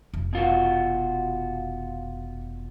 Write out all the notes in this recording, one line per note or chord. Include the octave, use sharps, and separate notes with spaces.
F1
B2 F4 F#4